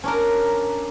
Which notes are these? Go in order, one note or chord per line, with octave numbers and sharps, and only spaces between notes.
C#4 D4 A#4